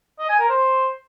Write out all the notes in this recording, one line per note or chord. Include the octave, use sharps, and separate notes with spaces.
D#5
G#5
A#4
C5